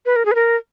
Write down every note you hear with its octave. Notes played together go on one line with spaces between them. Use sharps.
B4
A#4
G#4
B4
A#4